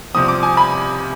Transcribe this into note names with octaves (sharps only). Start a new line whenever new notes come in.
C2 C3 F3 C4 D#6
D6
G#5
B5